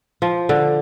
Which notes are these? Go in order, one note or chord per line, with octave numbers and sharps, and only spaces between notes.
F3
D3